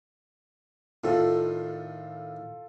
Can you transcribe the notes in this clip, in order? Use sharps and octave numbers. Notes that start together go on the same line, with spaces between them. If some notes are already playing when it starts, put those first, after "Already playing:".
A2 D#3 F4 A4